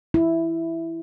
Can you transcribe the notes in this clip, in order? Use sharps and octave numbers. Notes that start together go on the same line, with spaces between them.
E4